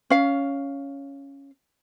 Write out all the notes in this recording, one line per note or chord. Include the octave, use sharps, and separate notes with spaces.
C#4 F5